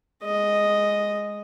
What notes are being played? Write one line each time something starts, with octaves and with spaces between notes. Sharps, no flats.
G#3 D#5